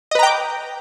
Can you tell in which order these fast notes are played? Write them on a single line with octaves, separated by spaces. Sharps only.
D#5 B4 A#5 G5 D6